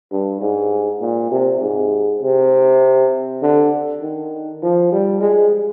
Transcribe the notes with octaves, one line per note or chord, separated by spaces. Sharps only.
G2
G#2
A#2
C3
G#2
C3
D3
D#3
F3
G3
G#3